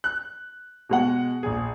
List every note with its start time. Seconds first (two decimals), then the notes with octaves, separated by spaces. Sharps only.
0.04 F#6
0.89 B2 G#3 F#5
1.43 A#1 G#4